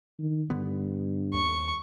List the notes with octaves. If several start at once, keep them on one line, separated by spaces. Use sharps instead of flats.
D#3
G2 D3 B3
D#2 C#6